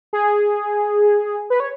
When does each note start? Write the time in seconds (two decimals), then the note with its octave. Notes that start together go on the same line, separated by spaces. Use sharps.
0.13 G#4
1.50 B4
1.60 C#5